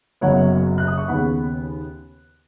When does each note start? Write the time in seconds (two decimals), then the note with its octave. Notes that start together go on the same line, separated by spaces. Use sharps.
0.21 F#1 F#2 F#3 B3 C#5 F#5
0.78 F#6
0.88 D#6
0.98 C#6
1.08 D#2 C#3 B3 F#5 B5